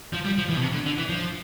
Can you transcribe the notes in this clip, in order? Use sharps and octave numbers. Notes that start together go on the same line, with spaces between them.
F3
G3
F3
E3
B2
C3
D3
D3
E3
F3